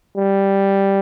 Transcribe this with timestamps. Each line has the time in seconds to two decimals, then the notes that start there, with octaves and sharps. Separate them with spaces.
0.17 G3